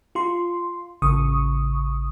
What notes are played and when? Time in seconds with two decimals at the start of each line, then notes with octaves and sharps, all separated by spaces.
0.15 F4 C6
1.02 A1 C#3 C#6 D#6